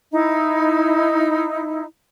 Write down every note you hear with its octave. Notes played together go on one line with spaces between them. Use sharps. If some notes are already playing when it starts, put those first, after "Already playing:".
D#4 E4